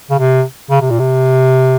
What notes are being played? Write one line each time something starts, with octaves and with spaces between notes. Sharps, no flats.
C#3
C3
C#3
C3
A#2
C3